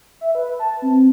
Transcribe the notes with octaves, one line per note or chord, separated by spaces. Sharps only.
E5
B4
A5
C4